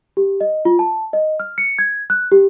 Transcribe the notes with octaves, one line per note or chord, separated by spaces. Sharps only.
G4
D#5
F4
A5
D#5
F6
C#7
G#6
F#6
G4